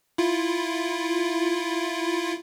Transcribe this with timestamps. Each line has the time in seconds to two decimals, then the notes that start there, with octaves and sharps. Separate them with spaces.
0.18 E4 F4